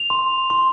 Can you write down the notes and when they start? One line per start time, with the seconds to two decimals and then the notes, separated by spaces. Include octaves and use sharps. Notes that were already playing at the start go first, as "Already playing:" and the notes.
Already playing: F7
0.10 C6
0.50 C6